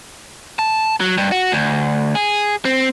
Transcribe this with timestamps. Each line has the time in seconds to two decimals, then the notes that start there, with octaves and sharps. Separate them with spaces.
0.59 A5
1.01 F#3
1.18 G2
1.32 F#4
1.52 D2
2.15 G#4
2.65 C4